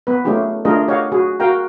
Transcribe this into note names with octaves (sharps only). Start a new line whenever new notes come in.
B3 B4
A3 C#4 D#4 F4 G4 G#4
A3 D4 F4 G#4 A#4 D#5
G4 C#5 D#5 F5 F#5
F#4 G#4
F#4 A#4 F5 G5 A#5